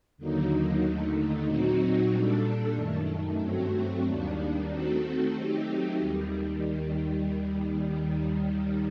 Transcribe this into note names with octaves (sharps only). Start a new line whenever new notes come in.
D#2 D3 F#3 A#3 D#4
D#2 D3 A3 D#4
A#2 F#3 C4 D#4 F#4
A#2 G3 D4 A4
F#2 D#3 A3
G2 F#3 A3 C4 F#4
D#2 D#3 G3 A#3 D4
D#3 A3 C4 F#4 A4
F#3 A3 C4 D#4 G4
D#2 D#3 G3